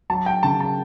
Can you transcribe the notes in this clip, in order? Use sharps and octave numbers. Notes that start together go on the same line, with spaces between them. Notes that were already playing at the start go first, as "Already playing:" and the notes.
F#3 A5
G5
C#3 A5
A5